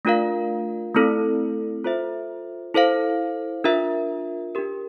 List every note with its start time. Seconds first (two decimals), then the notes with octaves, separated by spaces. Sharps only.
0.05 A3 D4 F4 A#4 F5
0.95 A3 C4 E4 A4
1.84 F4 A4 C5 E5
2.74 E4 A4 C5 F5
3.64 D4 F4 A#4 E5
4.55 D4 G4 A#4